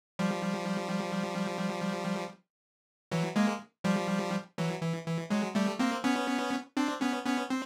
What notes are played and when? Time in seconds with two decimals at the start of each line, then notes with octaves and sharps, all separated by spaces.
0.19 F3 G3
3.12 E3 F#3
3.36 G#3 A#3
3.84 F3 G3
4.58 E3 F#3
4.82 E3
5.06 E3
5.30 F#3 G#3
5.55 G3 A3
5.79 A#3 C4
6.04 B3 C#4
6.77 C4 D4
7.01 B3 C#4
7.26 B3 C#4
7.50 C4